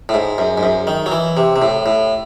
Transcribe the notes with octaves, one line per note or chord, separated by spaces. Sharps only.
A2
G#2
F#2
G#2
F#2
D#3
F#3
E3
C3
C3
A2
A2